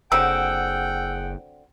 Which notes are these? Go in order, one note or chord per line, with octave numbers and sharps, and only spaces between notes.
F#1 D3 F#3 C4 G#4 F#5 G5 E6